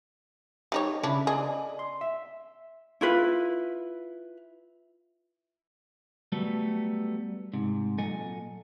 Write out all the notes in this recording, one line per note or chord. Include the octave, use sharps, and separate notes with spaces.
G3 D#4 C#5
C#3 C#4 D4 E4 B5
G#4 D5 D#5
C6
E5
E4 F4 B4
F#3 G3 A3 B3 A4
G#2 C3
A#2 F#3 A4 D#5 G#5